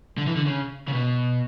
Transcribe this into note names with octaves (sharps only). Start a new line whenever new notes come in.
D3
E3
D3
C#3
C#3
B2